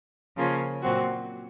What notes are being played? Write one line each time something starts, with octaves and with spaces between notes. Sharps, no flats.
C#3 F3 A#3 C#4
A#2 F#3 C4 F#4